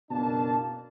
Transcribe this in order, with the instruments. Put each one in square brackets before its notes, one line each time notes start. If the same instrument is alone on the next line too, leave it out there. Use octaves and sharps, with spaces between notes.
[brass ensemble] F#1 B2 A#3 D4 A5